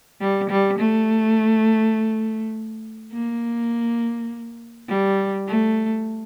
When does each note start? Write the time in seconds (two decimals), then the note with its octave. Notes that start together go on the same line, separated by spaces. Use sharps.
0.21 G3
0.50 G3
0.79 A3
3.13 A#3
4.89 G3
5.48 A3